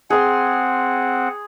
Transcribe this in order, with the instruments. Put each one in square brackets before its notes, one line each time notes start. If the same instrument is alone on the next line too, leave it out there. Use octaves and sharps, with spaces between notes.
[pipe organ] C4 F#5 [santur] G#4 C6